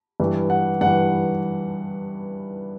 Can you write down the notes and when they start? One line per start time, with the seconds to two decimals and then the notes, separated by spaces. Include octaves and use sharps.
0.20 G2 E3
0.50 F#5
0.81 G2 E3 F#5